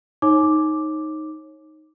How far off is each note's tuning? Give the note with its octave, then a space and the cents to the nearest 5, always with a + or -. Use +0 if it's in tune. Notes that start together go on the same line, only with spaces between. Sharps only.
D#4 +0 C#5 -30 D6 +0